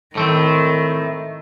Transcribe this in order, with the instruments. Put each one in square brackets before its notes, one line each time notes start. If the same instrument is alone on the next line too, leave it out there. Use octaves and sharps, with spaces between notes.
[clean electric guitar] A2 A3 C4 [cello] D#3